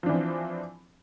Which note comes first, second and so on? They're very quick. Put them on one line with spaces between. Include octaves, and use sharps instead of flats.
F3 D4 E3 C4